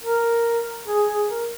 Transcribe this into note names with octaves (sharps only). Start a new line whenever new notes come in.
A#4
G#4
G#4
A#4